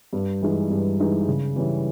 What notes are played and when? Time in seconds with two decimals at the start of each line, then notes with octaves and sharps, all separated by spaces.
0.13 G2
0.41 E3 G#3 D#4
0.70 G2
0.99 E3 G#3 D#4
1.28 C#3
1.56 E3 G3 C#4